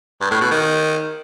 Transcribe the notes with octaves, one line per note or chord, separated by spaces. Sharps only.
G2
A2
B2
D#3